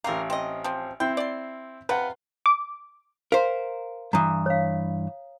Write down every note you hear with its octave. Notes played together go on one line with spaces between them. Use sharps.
A1 A#3 C4 A#4 F5
C4 D#5
F3 C4
C4 E4 G5
D5 C6
C3 F4 B4 F#5
D6
A#4 C5 F5
G2 E3 A#5 D#6
C#5 F5